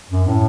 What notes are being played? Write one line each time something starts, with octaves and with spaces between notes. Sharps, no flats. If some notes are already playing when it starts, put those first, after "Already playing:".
F#2
A2